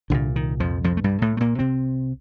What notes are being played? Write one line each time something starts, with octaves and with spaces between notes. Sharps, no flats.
C2 A#2 D3
D#3
F2 F3
F2 F3
A3
G2 G3
A2 A3
A3
A#2 A#3
C3 C4